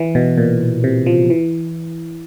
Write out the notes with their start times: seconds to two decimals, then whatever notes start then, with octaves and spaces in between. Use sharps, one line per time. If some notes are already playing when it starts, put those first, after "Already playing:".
Already playing: E3
0.15 B2
0.38 A#2
0.84 C3
1.06 F3
1.30 E3